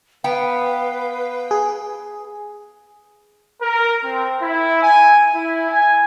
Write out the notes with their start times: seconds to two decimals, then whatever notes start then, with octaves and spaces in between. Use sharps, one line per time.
0.24 B3 B4 F5 G5
1.51 G#4
3.62 A#4
4.04 C4
4.42 E4
4.83 G#5
5.34 E4
5.70 G#5